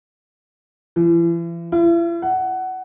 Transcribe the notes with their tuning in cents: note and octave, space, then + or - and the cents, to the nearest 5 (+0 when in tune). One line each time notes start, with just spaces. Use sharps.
E3 +40
E4 +45
F#5 +15